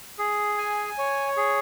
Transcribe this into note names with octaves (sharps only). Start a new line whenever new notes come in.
G#4
G#5
C#5
G#4